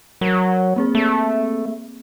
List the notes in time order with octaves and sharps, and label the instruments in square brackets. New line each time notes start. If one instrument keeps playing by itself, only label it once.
[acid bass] F#3 [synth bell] A#4 F#5
[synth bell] A#3 C4 G#4
[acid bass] A3